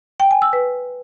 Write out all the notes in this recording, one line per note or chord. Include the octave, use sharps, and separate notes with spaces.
G5
G#5
E6
B4